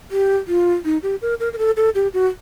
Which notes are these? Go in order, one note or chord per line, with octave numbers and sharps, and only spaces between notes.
G4
F4
D#4
G4
A#4
A#4
A#4
A4
A4
G4
F#4